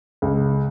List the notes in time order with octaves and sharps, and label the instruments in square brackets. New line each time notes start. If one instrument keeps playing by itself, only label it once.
[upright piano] C#2